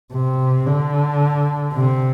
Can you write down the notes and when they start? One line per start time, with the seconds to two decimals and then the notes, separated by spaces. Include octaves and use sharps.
0.13 C3
0.66 D3
1.73 C3